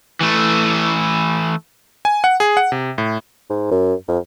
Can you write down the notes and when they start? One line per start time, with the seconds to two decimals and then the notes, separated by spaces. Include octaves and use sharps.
0.21 E3 A3
2.05 G#5
2.24 F#5
2.40 G#4
2.57 F#5
2.72 C3
2.98 A2
3.49 G#2
3.71 F#2
4.08 F2